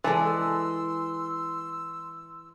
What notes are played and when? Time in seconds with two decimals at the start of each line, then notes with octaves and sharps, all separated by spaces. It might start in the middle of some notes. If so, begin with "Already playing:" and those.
0.04 E3 G#3 A4 D5 C6 E6